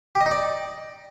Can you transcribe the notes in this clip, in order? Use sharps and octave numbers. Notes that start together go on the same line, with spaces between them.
G4
D#5
D#4
D5